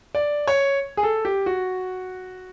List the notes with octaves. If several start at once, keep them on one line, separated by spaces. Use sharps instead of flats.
D5
C#5
G#4
A4
G4
F#4